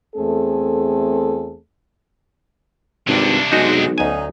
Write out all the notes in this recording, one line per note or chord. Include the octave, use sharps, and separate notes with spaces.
E2 A3 C4 G#4 A4
G#1 G2 C3 D4
B1 G#3 D#4 F#4
D2 F#3 C#4 D#4 G#5